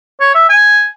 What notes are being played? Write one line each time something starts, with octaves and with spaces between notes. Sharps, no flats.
C#5
E5
G#5